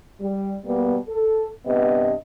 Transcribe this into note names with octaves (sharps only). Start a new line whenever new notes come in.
G3
B2 G3 A#3 B3
A4
G2 C3 B3 D#5